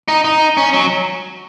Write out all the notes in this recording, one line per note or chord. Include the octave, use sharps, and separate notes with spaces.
D#4
D#4
C#4
F#3